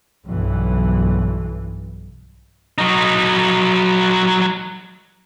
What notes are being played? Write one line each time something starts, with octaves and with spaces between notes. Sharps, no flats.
B1 G2 E3
F#3 D#4